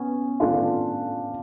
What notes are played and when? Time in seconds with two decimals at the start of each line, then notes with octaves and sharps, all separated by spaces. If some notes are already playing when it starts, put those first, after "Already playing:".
Already playing: B3 C#4
0.40 A3 D4 F4